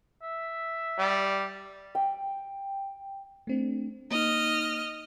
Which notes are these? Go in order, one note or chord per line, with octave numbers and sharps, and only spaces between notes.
E5
G3
G5
A3 C4 D4
A#3 D#4 D#5 F6